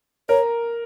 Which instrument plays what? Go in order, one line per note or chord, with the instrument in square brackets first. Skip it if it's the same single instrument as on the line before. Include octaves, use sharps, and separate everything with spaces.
[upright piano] A#4 [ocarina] C#5